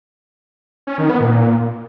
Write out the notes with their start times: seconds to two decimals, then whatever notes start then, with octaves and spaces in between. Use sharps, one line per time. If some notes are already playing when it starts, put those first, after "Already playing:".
0.87 C#4
0.98 D#3
1.09 B3
1.20 A#2